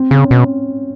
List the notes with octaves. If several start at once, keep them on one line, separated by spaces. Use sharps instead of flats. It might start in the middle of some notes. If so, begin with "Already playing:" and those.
Already playing: C4
C#3 C#4
B2